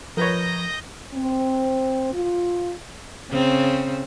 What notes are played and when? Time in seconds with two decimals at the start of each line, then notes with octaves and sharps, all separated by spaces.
0.17 F3 A#4 B4 C#5 D#5 G6 A#6
1.14 C4
2.13 F4
3.30 C#3 C4